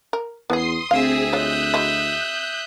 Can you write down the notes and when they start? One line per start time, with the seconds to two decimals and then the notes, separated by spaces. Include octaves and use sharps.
0.13 A#4
0.50 E2 B3 C#4 G#4 C6 D#6 C7
0.91 D2 C4 G#4 E5 F5 D#6
1.33 G#3 F4 C#5 F#6 G6
1.74 F#3 G#3 E4